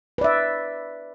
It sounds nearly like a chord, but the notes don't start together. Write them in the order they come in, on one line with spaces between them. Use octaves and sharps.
B4 D5 E5